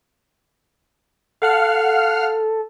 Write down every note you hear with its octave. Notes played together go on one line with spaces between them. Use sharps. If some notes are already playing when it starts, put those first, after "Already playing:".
A4 F5 F#5 F6